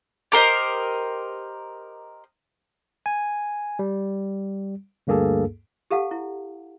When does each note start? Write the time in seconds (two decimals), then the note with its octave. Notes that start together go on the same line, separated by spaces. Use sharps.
0.32 G4 A#4 C5 D#5
3.06 G#5
3.79 G3
5.07 D2 G2 A#3 G#4 A4
5.91 G4 A4 F5 F#5 A5
6.11 E4